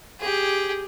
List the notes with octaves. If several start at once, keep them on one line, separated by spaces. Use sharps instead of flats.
G4 G#4